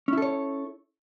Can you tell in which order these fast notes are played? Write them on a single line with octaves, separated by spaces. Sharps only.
C#4 E4 A4 C#5